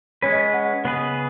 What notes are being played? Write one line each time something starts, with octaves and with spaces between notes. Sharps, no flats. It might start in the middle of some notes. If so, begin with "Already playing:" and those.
G#3 C#4 B4 C#5
D#5
D#5
F#5
C#3 B3 G#4 B4